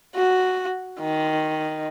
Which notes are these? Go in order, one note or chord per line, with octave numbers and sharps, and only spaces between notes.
F#4
D#3